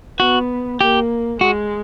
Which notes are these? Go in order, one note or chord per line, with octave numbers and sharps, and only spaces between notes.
B3 F#4
A#3 G4
G#3 F#4